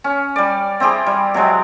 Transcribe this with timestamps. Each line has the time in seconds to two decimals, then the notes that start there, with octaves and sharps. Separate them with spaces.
0.04 C#4
0.36 G3 D5
0.80 C4 E4 G4 G#4
1.06 G3
1.34 C3 F#3 G#3